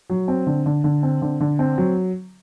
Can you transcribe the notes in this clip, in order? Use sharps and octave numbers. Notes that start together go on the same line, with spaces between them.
F#3
C4
D3
D3
D3
C4
D3
D3
C4
F#3